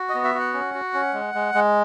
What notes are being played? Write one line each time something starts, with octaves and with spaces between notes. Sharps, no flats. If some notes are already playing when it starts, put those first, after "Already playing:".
Already playing: F#4
D#5
B3
E5
F#4 F#5
C#4
F#4
C#4
G#3
G#3
G#3